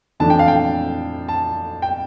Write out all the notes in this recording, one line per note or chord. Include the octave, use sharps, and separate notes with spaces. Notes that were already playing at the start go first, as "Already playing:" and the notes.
F2 E3 A3 D4 A5
G5
F5
G5
A5
G5